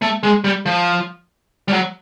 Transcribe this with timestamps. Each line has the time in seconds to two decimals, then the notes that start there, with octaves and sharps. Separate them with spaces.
0.02 A3
0.23 G#3
0.44 G3
0.66 F3
1.68 G3
1.72 F#3